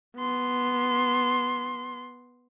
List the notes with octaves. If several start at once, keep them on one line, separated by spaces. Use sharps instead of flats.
B3 C6